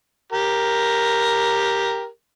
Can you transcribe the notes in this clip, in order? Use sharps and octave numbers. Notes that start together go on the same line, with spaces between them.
G4 A#4